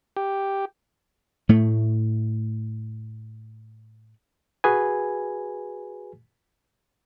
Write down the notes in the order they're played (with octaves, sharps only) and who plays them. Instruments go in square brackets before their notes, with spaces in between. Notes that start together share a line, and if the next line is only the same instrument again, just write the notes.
[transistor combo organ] G4
[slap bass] A2 A3
[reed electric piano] F#4 G#4 B4 G#5